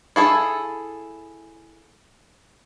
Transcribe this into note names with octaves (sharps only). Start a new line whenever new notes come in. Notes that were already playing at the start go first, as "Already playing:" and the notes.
E4 G#4 A4